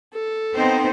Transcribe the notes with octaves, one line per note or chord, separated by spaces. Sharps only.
A4
B3 C4 D#4 C5